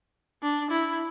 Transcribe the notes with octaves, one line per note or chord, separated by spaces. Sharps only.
D4
E4